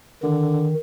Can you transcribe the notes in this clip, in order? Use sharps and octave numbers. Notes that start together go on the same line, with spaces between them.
D3 D#3